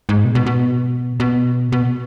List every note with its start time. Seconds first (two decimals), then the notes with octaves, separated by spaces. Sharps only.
0.09 G#2
0.25 B2
0.35 B2
0.46 B2
1.20 B2
1.72 B2